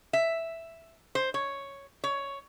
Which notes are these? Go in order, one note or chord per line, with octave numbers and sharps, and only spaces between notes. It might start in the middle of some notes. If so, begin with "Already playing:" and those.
E5
C5
C#5
C#5